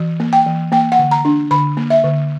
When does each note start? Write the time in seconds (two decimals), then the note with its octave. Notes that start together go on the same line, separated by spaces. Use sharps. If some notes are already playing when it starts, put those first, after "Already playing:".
Already playing: E3
0.20 A#3
0.33 G5
0.46 E3
0.72 A#3 G5
0.92 F#5
0.99 D3
1.11 A#5
1.25 D4
1.51 D3 B5
1.77 A#3
1.90 E5
2.04 D3